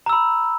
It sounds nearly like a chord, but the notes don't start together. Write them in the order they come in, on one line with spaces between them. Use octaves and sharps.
A#5 E6 B5